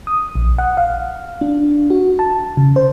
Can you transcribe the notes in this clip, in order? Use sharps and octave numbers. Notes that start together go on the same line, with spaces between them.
D#6
A#1
F#5
F5
D4
F#4
A5
C#3
C5